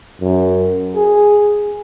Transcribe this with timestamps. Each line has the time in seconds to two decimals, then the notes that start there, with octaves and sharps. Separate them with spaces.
0.21 F#2
0.95 G#4